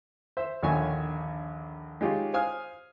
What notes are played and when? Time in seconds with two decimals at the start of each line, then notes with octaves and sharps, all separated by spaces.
0.37 C5 E5
0.62 A#1 D#2 D3 C#5 E5 G#5
2.01 G#3 D#4 F4 G4 C#5
2.33 C5 F5 G#5 D#6 F6